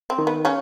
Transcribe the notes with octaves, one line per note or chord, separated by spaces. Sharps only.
C4
D#3
B3
C#3 C#4